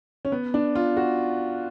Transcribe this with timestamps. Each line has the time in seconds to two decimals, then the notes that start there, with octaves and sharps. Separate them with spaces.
0.25 C#4
0.32 B3
0.54 D4
0.75 F4
0.97 F#4